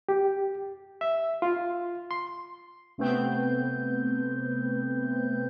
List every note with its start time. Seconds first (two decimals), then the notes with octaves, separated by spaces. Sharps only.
0.09 G4
1.01 E5
1.42 F4
2.11 C6
2.98 C3 A3 B3 C4 B4 G6